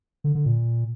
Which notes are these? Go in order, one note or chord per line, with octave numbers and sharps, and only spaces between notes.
D3
D3
A#2